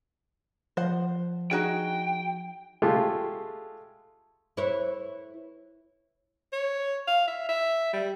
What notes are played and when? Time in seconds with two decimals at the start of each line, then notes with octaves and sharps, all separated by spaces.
0.77 F3 C5 F#5
1.51 D#4 F#4 G#4 G5
2.82 G#3 A3 F4 G4
4.57 E4 B4 C#5
6.53 C#5
7.08 F5
7.28 E5
7.49 E5
7.93 G3